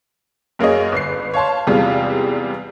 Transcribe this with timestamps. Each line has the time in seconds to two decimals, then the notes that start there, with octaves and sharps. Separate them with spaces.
0.59 F#2 A#3 C#4 G#4 D#5
0.92 G1 C7
1.34 C#5 F5 A5 C6
1.67 E2 C3 G3 G#3 F4